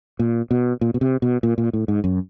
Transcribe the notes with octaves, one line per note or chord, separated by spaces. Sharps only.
A#2
B2
A#2
B2
C3
B2
A#2
A#2
A2
G#2
F#2